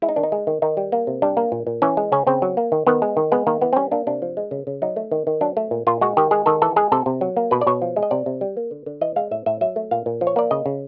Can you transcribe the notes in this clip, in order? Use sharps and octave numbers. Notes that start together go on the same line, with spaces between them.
G#3 E4
D#4
D#3 D4
D#4
G#3
D#3
D#3 D#4
G3
A#3
C3
G3 D4
A#3
A#2
A#2
E3 C#4
G#3
C#3 C#4
C#3 C4
F#3
A#3
D#3
D#3 B3
G#3
D#3
G#3 B3
D#3 A#3
E3 B3
C4
G3 C#4
A#3 D4
C3 D4
F3
G#3
C#3
C#3
F#3 D#4
A3
D#3
D#3
F#3 D4
A3
A#2
A#2 F4
G#3 F#4
D#3 G4
G#3 G#4
D#3 A4
E3 A4
G#3 G#4
C3 A4
C3
F#3
A#3
B2 B4
D5
B2 C#5
F3
G#3
D#5
C3 D5
C3
G3
A#3
D3
D3
E3 D#5
G#3 F5
A2 E5
A2 E5
F#3 E5
A3
A#2 F5
A#2
F3
C#5
A#3 D5
C#3 D#5
C#3